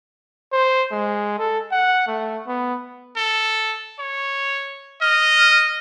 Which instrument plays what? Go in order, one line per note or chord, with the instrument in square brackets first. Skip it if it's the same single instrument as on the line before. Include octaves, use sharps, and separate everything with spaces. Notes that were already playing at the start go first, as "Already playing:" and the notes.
[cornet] C5
G#3
A4
F#5
A3
B3
[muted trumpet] A4
C#5
[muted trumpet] D#5 [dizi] F6